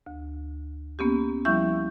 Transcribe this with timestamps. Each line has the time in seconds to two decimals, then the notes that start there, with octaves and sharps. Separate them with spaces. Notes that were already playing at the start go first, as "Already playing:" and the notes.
0.06 D2
0.99 A#3 B3 C#4 G4
1.45 F3 G3 E4 E5 C#6 G6